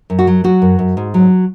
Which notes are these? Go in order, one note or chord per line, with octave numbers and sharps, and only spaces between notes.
F#2
F#4
F#3
F#3 F#4
F#2
F#2
G#2
F#3